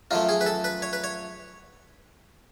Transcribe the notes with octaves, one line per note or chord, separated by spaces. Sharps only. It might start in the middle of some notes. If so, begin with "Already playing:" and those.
F#2 F3 A3 F4
G#4
B4
A4
B4
C#5
B4
C#5